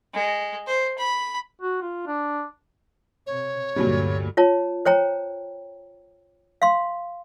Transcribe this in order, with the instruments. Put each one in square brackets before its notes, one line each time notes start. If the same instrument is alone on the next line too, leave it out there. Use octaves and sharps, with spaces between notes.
[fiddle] G#3
C5
B5
[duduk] F#4
F4
D4
[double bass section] C3 [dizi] C#5
[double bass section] D2 G2 D3 [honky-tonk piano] A#2 F#3 G3
[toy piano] F4 C#5 A5
C5 C#5 G5 A#5
F5 C6